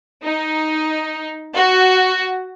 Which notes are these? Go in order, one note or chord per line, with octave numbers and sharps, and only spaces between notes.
D#4
F#4